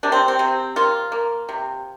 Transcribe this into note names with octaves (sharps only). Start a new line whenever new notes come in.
C3 D4
C4
C4
C3
A#3 F4
A#3
C3